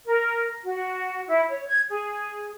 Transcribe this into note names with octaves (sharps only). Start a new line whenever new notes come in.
A#4
F#4
E4
C#5
G#6
G#4